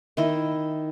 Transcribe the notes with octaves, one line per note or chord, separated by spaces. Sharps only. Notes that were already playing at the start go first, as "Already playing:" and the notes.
D#3 E4 D#5